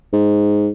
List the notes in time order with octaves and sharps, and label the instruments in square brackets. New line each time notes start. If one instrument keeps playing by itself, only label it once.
[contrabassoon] G#2